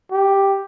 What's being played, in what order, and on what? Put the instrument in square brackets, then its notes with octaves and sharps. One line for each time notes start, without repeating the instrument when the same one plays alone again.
[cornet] G4